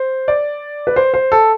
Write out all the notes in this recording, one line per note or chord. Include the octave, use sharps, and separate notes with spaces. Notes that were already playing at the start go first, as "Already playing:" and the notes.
Already playing: C5
D5
B4
C5
C5
A4